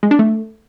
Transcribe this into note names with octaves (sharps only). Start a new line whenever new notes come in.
G#3
D4
A3